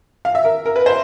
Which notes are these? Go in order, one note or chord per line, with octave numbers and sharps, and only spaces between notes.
F5
E5
A#4
A#4
B4
C5